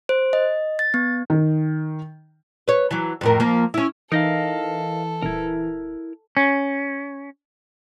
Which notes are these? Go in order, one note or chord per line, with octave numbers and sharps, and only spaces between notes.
C5
D#5
A6
B3
D#3
B4 C#5
E3 F#3
F2 A2 A#4
F3 A#3
C#4 E4
E3 D#4 A4 A#4 D#5 F5
D#1 E4 A#4
C#4